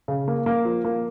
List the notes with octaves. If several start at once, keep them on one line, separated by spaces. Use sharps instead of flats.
C#3
A#3
A#3
F3
A#3